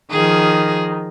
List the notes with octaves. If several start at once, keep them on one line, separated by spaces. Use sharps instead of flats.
D#3 F3 G#4